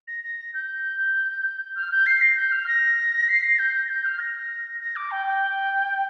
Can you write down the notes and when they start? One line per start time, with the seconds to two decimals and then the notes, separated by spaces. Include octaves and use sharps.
0.07 A#6
0.24 A#6
0.54 G6
1.75 F6
1.91 G6
2.06 C7
2.21 A#6
2.37 G6
2.52 F6
2.67 A#6
3.29 C7
3.43 A#6
3.59 G6
3.74 A#6
3.89 G6
4.05 F6
4.19 A#6
4.80 A#6
4.96 D6
5.11 G5
5.26 G5